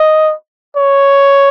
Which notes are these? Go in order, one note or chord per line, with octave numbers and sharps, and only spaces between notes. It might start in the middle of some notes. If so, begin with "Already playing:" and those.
Already playing: D#5
C#5